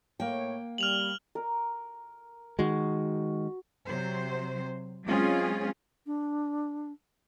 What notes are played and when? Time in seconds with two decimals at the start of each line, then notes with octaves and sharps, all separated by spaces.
0.20 A2 A#3 C#5 G5
0.78 G3 F6 F7 F#7
1.35 A#4
2.59 D#3 G#3 F#4
3.86 C3 F#3 C5
5.05 F#3 G#3 C4 C#4 F4 G#4
6.06 D4